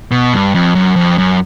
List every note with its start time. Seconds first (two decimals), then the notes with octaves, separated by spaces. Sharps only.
0.11 B2
0.33 G2
0.55 F2
0.75 F#2
0.96 F2
1.18 F#2